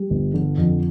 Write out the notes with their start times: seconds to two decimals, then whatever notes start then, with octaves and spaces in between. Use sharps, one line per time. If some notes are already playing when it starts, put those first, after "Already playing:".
Already playing: G3
0.10 G1
0.34 D3
0.58 F2